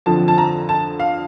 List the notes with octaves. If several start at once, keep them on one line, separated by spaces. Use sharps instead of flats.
F2 D3 F3 C4 A5
A5
A#5
A5
F5